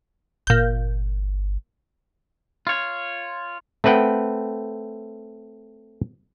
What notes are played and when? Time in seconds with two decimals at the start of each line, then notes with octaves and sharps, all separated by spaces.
0.47 G1 A#2 G6
2.67 F4 C#5
3.84 A3 C4 B4 F#5 G5